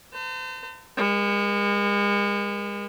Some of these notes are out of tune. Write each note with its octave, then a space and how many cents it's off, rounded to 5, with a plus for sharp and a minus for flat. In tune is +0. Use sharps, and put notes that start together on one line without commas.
C5 -40 A5 +45
G#3 -35 A#4 +40